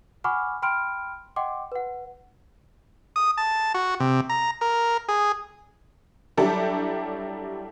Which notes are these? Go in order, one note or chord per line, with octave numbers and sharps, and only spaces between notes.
F#5 G#5 B5 C#6 D6 F6
G5 B5 C6 F6 D7
D#5 F#5 G5 C6 D6
B4 F#5
D#6
A5
F#4
C3
A#5
A#4
G#4
F#3 G3 D4 E4 G4 A4